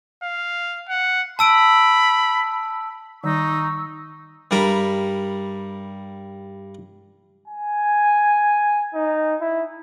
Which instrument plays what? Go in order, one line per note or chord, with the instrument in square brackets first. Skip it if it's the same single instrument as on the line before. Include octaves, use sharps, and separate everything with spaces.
[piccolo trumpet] F5
F#5
[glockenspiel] A5 E6 D7 [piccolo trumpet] B5
[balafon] D#3 G3 [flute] D#4 [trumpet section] C#6 [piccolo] E6
[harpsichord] G2 G3 A#4 B5
[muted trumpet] G#5
D#4
E4